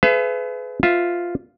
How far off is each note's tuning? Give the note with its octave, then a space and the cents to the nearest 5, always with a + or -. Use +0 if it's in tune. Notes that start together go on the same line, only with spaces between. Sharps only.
G#4 +40 B4 +30 E5 +45
F4 +0 B4 +30 E5 +0